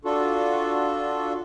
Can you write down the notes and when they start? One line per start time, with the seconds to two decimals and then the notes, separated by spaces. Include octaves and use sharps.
0.05 D4 F4 F#4 A4